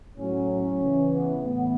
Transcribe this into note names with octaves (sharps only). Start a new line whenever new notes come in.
A2 F#3 C#4
C#4
C#3 E3
B3
A2 E3 B3